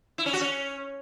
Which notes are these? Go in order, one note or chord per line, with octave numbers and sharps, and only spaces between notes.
E4
C#4
F#4
C#4